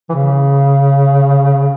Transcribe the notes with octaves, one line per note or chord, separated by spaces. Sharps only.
E3
C#3